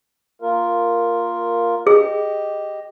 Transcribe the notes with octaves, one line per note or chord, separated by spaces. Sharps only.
A#3 F4 A#4
G4 G#4 D#5